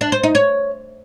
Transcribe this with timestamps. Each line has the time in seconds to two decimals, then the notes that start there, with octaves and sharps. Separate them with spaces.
0.01 D4
0.12 C5
0.23 D#4
0.35 C#5